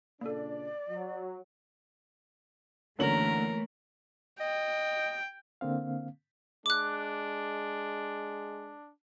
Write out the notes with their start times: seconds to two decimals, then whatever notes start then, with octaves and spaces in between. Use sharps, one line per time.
0.21 A#2 C#3 A#3 D4 A4 D5
0.90 F#3
2.99 F#2 D3 E3 A3 A#3 A#4 C#5 F#7
4.41 D#5 G5
5.61 D3 A#3 C4 F5
6.66 G#3 D4 D6 F#6